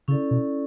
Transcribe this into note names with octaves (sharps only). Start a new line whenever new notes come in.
C#3 C#4 E4 A4 D5
B2